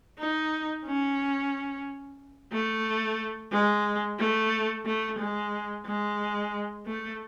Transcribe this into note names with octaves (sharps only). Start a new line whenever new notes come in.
D#4
C#4
A3
G#3
A3
A3
G#3
G#3
A3